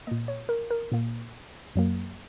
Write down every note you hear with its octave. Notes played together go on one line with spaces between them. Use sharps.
A#2 A#3 D#5
C#5
A#4
A#4
A#2 A#3
F#2 F#3 A#3